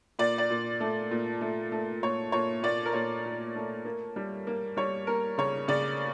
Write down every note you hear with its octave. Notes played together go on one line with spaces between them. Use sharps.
A#2 D5
D5
A#2
A3
A#2
A3
A3
A#2 C#5
A#2 C#5
A#2 D5
A#4
A#2 C#5
A#2
A3
A#3
G3
A#3
G3 C#5
A#3 A#4
C#3 C#5
C#3 D5